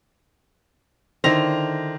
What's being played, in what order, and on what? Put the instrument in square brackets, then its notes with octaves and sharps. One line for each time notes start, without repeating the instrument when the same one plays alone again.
[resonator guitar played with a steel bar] D3 E4 C5 [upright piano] D#3 A#6 F7